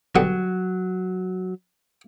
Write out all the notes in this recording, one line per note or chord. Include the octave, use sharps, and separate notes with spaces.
D3 F#3 G3 B3